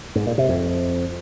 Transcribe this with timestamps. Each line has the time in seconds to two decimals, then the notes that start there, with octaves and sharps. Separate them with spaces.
0.16 G#2
0.27 A#2
0.38 C3
0.49 F2